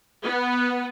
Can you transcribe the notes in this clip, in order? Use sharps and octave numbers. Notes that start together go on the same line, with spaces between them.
B3